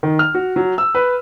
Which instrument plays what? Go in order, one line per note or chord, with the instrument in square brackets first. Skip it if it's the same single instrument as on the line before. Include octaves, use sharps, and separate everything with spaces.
[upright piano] D#3
F6
F#4
F#3
E6
B4